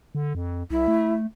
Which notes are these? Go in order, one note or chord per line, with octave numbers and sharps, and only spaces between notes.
D3
F2
C2 E4
A3